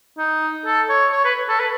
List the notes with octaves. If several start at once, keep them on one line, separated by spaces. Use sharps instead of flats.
D#4
A4
C#5
C#5
B4
A4
B4